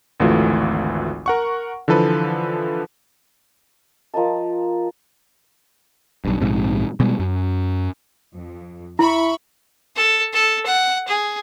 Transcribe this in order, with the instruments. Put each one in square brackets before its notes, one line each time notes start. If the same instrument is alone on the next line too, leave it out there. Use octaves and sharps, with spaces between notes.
[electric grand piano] G#1 D2 E3 A3 F4 F#4
A#4 F#5 C#6
D3 E3 F3 A4 B4
[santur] F3 A#4 D#5 A5
[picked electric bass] B1 G2
A#1 G#2 C3
B2 G3 G#3
F#2
[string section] F2
[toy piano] E4 [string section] E5 B5 C#6
[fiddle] A4
A4
F#5
G#4